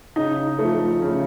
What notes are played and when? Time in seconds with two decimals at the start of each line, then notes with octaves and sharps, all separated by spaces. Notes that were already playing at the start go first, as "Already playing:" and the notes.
0.16 C#3 D#4
0.59 F3 A3
1.02 C#3